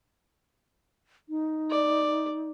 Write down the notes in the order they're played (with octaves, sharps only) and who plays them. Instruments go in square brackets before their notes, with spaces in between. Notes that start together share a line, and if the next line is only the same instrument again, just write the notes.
[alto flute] D#4
[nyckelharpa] D5